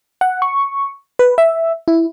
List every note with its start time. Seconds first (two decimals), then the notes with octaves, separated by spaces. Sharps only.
0.21 F#5
0.42 C#6
1.19 B4
1.38 E5
1.88 E4